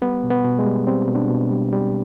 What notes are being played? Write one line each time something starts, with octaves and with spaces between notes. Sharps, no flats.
G3 B3
B2
B3
B2
G#3
G3
G3 C4
B2
D4
B2
G3
G3